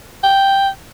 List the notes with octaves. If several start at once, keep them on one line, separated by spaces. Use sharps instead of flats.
G5